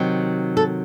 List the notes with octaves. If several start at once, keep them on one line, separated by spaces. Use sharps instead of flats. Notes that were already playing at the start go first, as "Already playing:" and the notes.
Already playing: C3 D#3 F#3
A4